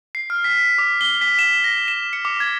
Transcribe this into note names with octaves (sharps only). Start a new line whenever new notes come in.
C7
F6
B6
D6
G7
B6
E7
A#6
E7
C#7
D6
G#6